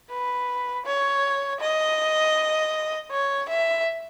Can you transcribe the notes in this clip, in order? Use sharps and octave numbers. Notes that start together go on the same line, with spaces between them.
B4
C#5
D#5
C#5
E5